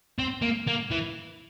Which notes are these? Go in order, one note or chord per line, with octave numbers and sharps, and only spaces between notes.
C4
A#3
A#3
E3